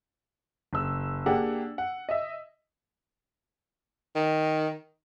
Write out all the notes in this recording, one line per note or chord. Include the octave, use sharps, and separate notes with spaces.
F#1 E6
A#3 D4 G4 G#4 F#5
F#5
D#5 E5
D#3